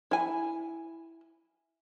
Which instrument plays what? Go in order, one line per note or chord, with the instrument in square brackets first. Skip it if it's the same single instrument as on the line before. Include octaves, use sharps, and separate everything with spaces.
[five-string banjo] E4 G#5